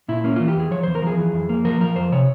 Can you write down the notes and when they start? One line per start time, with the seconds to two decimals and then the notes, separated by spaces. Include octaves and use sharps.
0.08 A#2 E4
0.24 A#3 C#4
0.36 E3 F4
0.48 G4
0.56 E2 G#4
0.71 F3 C#5
0.83 E2 C5
0.95 A#4
1.02 F3 G#4
1.18 E3
1.33 F2
1.49 A#3
1.65 F3 A#4
1.81 F3 A#4
1.96 F2 C5
2.12 C3 C#5